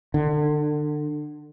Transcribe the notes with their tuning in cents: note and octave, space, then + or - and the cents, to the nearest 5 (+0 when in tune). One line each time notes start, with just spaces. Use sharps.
D3 +30